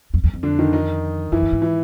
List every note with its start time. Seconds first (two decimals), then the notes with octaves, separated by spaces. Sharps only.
0.14 F2
0.24 E2
0.34 F2
0.43 D3 D4
0.59 D#3 D#4
0.73 D#3 D#4
1.32 F#2 E3 E4
1.42 G2
1.53 G#2
1.62 E3 E4